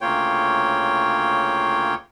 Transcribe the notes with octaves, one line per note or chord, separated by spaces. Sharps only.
D2 C#3 A#3 F4 C#5 G5